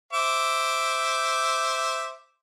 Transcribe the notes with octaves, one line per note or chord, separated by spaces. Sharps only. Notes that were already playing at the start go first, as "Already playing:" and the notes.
C5 E5 D6